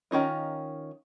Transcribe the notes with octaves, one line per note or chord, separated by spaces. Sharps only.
D#3 C#4 D#4 F4